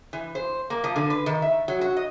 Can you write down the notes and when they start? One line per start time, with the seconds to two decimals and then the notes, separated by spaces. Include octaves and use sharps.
0.13 E3
0.35 C5
0.70 A#3
0.84 F3
0.96 D3
1.10 B4
1.26 D#3
1.42 E5
1.68 F#3
1.81 F#4
1.97 D#5